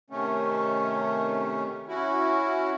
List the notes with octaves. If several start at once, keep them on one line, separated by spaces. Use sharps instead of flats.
C3 D#3 A3 C#4
C#4 E4 F#4